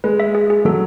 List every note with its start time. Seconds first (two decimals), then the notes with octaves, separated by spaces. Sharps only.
0.04 G#3 B4
0.20 E5
0.35 G#4
0.50 G#4
0.65 F#3 A4